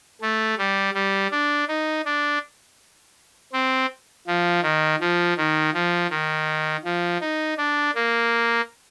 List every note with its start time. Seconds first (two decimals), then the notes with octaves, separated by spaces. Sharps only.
0.22 A3
0.58 G3
0.94 G3
1.31 D4
1.68 D#4
2.05 D4
3.53 C4
4.27 F3
4.63 D#3
5.00 F3
5.37 D#3
5.74 F3
6.10 D#3
6.84 F3
7.21 D#4
7.57 D4
7.95 A#3